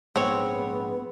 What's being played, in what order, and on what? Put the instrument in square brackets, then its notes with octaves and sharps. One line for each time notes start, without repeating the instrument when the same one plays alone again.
[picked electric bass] A#1 G#2 G#3 [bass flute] B3 [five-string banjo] C4 C#5